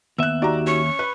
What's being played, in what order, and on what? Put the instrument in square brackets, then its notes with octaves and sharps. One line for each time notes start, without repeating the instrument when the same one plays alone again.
[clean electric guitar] D#2 E5 [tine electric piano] B3 [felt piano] E6 F#6
[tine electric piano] D#4 F#4 G4 [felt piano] D5 A#5
[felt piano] C#4 [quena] C#6
[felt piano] B4 [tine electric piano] B5